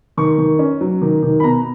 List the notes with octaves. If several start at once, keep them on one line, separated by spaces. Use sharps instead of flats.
D#3 C#6
D#3
C#4
F#3
D#3
D#3
B5
B2 A#5